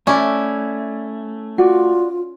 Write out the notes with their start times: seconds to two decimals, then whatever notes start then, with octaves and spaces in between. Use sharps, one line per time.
0.07 A3 C#4 E4 D5
1.58 F4 F#4 D5